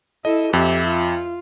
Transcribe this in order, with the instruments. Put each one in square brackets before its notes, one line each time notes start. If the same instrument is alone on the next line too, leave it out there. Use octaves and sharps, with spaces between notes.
[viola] E4 A4 [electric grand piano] D#5
[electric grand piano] F2 [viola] G4 E5
[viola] F4